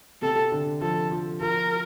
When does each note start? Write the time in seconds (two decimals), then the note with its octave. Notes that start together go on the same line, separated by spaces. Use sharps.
0.22 C3 A4
0.52 D3
0.81 F3 A4
1.11 F3
1.41 F3 A#4